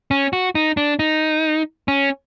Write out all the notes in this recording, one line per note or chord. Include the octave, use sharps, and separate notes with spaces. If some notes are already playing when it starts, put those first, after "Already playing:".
C#4
F#4
D#4
D4
D#4
C#4